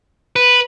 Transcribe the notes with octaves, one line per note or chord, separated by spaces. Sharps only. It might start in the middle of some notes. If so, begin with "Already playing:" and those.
B4